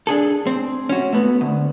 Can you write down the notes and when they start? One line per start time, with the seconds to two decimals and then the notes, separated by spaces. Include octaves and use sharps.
0.07 D4 G#4 A4
0.47 C4
0.89 C#4 F#4
1.13 A3 B3
1.41 D2